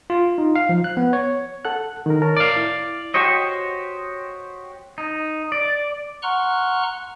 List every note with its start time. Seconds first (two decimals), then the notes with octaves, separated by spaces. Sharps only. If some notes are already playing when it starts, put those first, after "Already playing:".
0.10 F4
0.38 D#4
0.56 F5
0.69 F3
0.84 F#6
0.97 B3
1.13 C#5
1.65 A4 F#5 F#6
2.06 D#3 A#4
2.22 A#4 C#5 A5
2.37 D5 F5
2.56 E4
3.14 F#4 G4 C5 C#5 D#5
4.98 D#4
5.52 D5
6.23 F#5 A#5 C6 C#6 F6 F#6